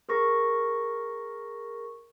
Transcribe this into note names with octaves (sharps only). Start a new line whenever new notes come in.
G#4 A#4 C#6 A#6